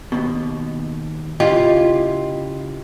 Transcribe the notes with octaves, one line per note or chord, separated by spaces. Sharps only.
D#2 B2
C#3 E4 F4 G4 D#5 C6